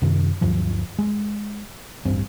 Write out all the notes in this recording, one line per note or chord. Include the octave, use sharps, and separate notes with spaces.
F#2 C3 D#3
D2 G2 F3 F#3
G#3
D1 A1 G2 C4